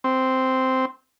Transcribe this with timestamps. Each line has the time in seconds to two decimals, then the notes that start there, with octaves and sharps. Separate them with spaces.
0.04 C4